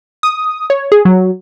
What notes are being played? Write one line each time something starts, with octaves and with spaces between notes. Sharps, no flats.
D#6
C#5
G#4
F#3